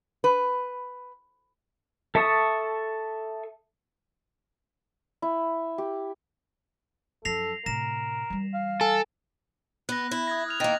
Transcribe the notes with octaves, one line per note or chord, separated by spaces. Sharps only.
B4
A4 E5 A5 C#6 D#6
E4
G4
F#2 F3 A4 A#6 C7 F7
A2 C3 A#4 A#6 E7
E3 G3
F5
A4 G#5
B3 F#6 A#6
E4
D#6 G#6 A#6
D#6 F6 F7
D#3 A#3 A6 A#6